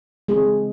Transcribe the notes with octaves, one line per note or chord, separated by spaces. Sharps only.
C#3 E3 G#3 C4 G#4